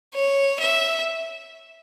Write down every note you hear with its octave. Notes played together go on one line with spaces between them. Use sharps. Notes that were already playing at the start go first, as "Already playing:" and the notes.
C#5
E5